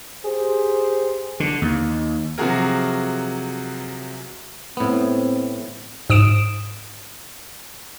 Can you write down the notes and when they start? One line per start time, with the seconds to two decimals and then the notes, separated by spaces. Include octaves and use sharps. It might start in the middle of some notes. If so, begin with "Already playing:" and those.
0.25 G4 G#4 C5
1.40 D3
1.62 D#2
2.38 C3 F3 F#3 F#4 G#4 A#4
4.77 A2 B3 C4
6.10 G#2 D#6 D7 E7